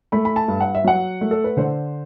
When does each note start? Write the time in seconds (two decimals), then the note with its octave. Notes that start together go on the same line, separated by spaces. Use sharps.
0.12 A3 B5
0.25 B5
0.36 A5
0.48 G2
0.61 F#5
0.75 E5
0.84 F#3 F#5
1.21 A3
1.31 A4
1.44 B4
1.57 D3 C5